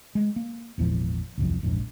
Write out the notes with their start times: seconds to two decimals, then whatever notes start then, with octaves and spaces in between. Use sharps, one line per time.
0.15 G#3
0.36 A#3
0.78 G#1 E2 A#2 F3
1.37 D1 G1 C2 F2
1.63 E1 A#1 F2 G#2